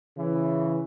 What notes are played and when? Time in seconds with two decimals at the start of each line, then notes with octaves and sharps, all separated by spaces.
0.17 C#3 E3